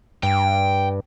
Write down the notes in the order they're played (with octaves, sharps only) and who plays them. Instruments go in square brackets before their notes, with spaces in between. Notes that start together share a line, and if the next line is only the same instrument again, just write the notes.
[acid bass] G2 [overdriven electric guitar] G5